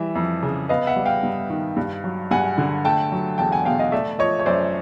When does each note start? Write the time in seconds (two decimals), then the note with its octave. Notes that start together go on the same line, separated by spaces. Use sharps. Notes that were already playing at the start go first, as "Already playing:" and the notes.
Already playing: E3 G3 E5
0.15 F2
0.43 C#3
0.69 B3 D#5 F5
0.87 E5 F#5
0.96 G3
1.05 F5 G5
1.23 G2
1.50 D#3
1.76 G2
2.04 F#3
2.31 G2 F#5 G#5
2.58 D3
2.85 A3 G5 A5
3.12 F#3
3.38 E2 G5 A5
3.52 F#5 G#5
3.65 B2 F5 G5
3.79 D#5 F5
3.92 A3 D5 E5
4.19 F3 C#5 D#5
4.40 C#5
4.46 F#2 C5 D5